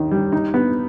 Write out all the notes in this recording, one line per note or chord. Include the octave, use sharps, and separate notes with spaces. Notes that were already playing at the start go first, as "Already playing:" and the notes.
Already playing: D#2 D#3
G3
D#4
B3